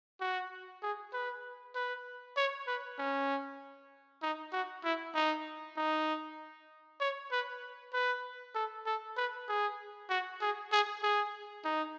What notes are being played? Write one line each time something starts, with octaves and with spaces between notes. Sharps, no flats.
F#4
G#4
B4
B4
C#5
B4
C#4
D#4
F#4
E4
D#4
D#4
C#5
B4
B4
A4
A4
B4
G#4
F#4
G#4
G#4
G#4
D#4